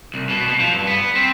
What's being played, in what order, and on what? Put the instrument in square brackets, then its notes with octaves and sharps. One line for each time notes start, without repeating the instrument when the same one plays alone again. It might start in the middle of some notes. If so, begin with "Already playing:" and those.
[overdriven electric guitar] C2
B2
B2
F3
G2
B3
C4